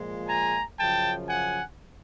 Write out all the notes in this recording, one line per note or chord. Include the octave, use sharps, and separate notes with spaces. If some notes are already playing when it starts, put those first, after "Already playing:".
Already playing: A#2 F3 G#3
G#5 A#5
F#2 C#3 F3 G5 A5
F#5 G#5